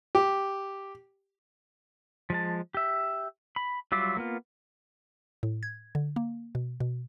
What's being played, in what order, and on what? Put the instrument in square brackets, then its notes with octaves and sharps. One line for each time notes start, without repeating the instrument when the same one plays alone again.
[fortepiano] G4
[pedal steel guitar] F3 G#3 A5
G4 E5
B5
F#3 G3 F4 E5 D6
A#3 B3 F4
[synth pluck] A2
G#6
D3
A#3
B2
B2